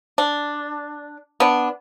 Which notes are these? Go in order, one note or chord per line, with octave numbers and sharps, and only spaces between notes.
D4
B3 D4